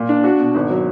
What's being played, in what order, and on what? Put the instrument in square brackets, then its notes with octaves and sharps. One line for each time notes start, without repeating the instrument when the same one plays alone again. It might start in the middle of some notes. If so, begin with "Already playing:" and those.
Already playing: [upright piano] A#2
D4
F#4
B2
G#1
F#3